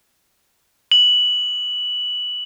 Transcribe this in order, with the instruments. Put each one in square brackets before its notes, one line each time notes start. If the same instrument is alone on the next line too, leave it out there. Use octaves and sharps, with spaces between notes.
[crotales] F#7